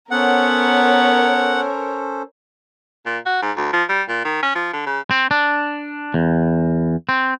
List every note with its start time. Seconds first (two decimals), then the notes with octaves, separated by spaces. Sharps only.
0.11 B3 C#4 A4 A#4 C5 C#5 F#5
3.06 A#2
3.26 F#4
3.42 G#2
3.57 D2
3.73 F3
3.89 G3
4.09 A#2
4.25 D#3
4.43 C#4
4.55 F3
4.73 D3
4.86 C#3
5.11 C4
5.31 D4
6.14 E2
7.09 C4